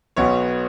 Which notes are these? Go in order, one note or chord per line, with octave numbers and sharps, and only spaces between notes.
B1 B2 B3 C#5